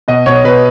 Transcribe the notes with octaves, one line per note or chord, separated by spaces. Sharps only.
B2 D#5
B2 C#5
B2 B4